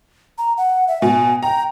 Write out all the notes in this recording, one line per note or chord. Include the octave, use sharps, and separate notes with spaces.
A#5
F#5
E5
B2 G#5
G5 A#5